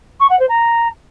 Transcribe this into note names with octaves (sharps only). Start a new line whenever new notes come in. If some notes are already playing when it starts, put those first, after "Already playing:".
C#6
F#5
C5
A#5